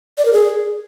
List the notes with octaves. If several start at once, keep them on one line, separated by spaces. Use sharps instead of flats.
D5
A#4
G#4